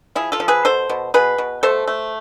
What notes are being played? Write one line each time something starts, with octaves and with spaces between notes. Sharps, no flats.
F3 E4 G#4
F4 A4
F3
G#4 B4
B2 A4 C5
B2
B2 G#4 B4
B2
A3 A4 C5
A3